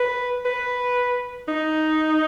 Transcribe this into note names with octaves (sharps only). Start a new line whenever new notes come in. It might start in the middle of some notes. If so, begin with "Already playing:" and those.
Already playing: B4
B4
D#4